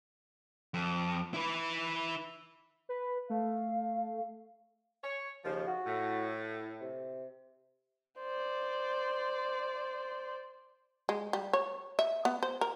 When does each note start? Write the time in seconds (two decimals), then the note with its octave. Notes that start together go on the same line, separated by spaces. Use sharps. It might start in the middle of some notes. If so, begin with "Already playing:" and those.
0.74 F2
1.34 E4 B4
2.89 B4
3.30 A3 F5
5.03 C#5
5.45 D#2 C#3 F3
5.67 F#4
5.86 A2
6.81 C3
8.20 C5 D5
11.09 G#3
11.33 G3
11.53 C#5
11.99 E5
12.25 B3
12.43 C5
12.61 A#4